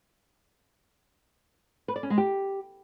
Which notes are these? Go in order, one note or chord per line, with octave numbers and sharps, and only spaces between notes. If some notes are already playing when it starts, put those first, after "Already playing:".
B4
D5
C#4
G#3
G4